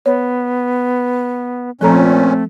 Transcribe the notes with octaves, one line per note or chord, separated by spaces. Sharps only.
B3 C#5
A#2 F3 A3 C4 C#4 A4 A#5